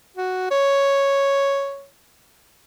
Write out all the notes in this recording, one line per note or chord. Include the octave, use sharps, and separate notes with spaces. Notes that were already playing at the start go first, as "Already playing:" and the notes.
F#4
C#5